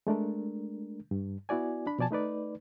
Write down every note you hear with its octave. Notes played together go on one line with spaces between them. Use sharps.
G#3 A3 D4 A#4
G2
B3 E4 F#4 D5 G#5
D4 B5
B2 F3 D5 G#5 A5
A3 D#4 B4 D5